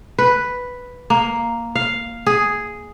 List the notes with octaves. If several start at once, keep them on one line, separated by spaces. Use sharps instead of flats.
B4
A#3
F5
G#4